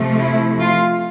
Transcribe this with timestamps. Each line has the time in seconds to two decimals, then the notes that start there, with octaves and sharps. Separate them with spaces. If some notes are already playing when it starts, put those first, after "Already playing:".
Already playing: C3 F3 A3
0.19 E4
0.60 F4